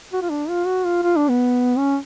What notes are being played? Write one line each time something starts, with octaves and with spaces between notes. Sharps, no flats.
F#4
F4
D4
F4
F#4
F4
F4
D4
B3
C#4